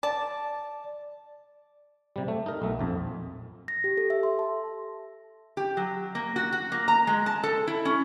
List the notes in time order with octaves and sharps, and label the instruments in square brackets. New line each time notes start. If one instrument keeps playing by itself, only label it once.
[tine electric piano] D5 [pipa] A5
[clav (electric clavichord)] C3 G3
A3
D#4 A#4
B1 A3
A#1 F2
[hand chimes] A#6
G4
A4
E5
C6
A5
[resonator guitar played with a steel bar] G4
F#3
A#3
F#4
F#4
A#3
A#5
G#3
A5
A4
E4
C#4